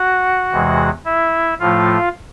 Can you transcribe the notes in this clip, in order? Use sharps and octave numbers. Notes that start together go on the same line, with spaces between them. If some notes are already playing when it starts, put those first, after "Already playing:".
Already playing: F#4 F#5
E2 C3 E3 G#3
E4 E5
A2 F3 A3 F4 F5